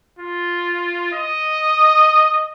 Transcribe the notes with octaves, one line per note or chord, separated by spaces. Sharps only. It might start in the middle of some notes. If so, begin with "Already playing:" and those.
F4
D#5